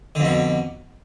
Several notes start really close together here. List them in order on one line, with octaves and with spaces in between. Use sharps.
D3 F2 B2